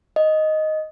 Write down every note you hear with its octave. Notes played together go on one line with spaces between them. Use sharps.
D#5